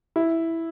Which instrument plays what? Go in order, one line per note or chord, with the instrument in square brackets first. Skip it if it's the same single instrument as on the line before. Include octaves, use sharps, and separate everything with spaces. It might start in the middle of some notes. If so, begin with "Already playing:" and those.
[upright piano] E4